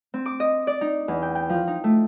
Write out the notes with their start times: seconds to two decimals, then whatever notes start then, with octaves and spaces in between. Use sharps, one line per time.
0.14 C4
0.26 D6
0.40 D#5
0.67 D5
0.81 D#4
1.08 E2
1.22 G5
1.35 G5
1.49 F3
1.67 D#4
1.84 A3